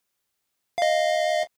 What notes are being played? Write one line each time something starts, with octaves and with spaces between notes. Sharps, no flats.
D#5 F5